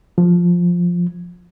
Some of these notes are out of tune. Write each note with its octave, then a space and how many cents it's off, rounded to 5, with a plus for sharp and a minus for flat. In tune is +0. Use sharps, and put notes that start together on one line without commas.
F3 +5